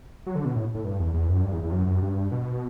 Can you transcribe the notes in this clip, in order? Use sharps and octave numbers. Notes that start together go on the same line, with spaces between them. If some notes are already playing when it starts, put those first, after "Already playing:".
F#3
D3
B2
A2
A2
G2
E2
E2
F#2
G2
E2
E2
F#2
F#2
G2
B2